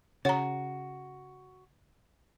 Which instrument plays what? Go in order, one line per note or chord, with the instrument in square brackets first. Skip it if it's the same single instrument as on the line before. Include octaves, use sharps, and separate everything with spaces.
[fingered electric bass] C#3 [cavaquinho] F#4 [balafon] C#5 A#5